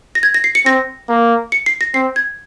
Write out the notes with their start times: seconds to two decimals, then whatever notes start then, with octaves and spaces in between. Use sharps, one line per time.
0.15 A#6
0.23 G#6
0.34 A#6
0.44 C7
0.55 C#7
0.66 C4 A#6
1.09 A#3
1.52 C#7
1.66 C7
1.81 A#6
1.94 C4 C7
2.16 G#6